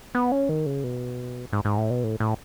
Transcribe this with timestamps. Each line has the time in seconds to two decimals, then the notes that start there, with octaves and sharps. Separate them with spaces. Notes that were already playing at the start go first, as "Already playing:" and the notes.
0.15 B3
0.32 C#4
0.49 D#3
0.66 C#3
0.84 B2
1.53 G#2
1.65 G#2
1.78 A2
1.90 B2
2.04 A2
2.20 A2